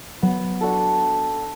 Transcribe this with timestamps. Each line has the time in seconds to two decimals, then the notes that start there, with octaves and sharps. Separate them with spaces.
0.22 F#3 B3
0.61 D4 F#4 A4